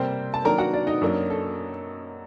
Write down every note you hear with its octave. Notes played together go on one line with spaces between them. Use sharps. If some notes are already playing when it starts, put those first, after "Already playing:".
Already playing: C3 G3 A#3 C4 C5
A5
D#3 F#3 A#3 D4 A#4 A#5
F#4 F#5
D4 D5
D#4 D#5
F#2 F#3 A#3 D4
A4